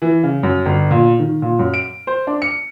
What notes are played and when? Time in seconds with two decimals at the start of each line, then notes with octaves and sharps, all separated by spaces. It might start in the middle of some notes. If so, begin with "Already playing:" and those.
0.02 E3
0.23 C#3
0.43 F#2
0.66 G1
0.91 A#2
1.20 D#3
1.42 A#2
1.59 F#2
1.74 D7
2.07 C5
2.27 D4
2.42 C#7